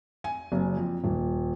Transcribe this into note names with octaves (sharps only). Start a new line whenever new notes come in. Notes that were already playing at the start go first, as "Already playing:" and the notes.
G#5
F#1
F2
D#1